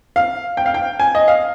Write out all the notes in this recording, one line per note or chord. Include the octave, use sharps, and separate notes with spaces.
F5
G5
F5
G5
G#5
D#5
F5